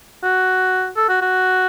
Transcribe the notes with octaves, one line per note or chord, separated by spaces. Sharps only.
F#4
A4
F#4
F#4